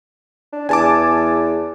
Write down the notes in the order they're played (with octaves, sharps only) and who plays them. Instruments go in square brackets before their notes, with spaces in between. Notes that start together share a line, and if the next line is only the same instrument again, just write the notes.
[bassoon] D4
[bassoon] E2 [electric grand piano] G#5 A5 D6